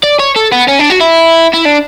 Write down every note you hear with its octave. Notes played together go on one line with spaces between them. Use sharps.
D5
C#5
A4
B3
C#4
D4
F#4
E4
E4
D4